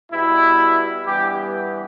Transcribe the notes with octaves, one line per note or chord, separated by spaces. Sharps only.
B2 G3 B3 E4
G2 E3 G3 B3 G4